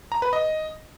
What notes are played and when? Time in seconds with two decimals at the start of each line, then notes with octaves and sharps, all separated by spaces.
0.12 A#5
0.22 B4
0.33 D#5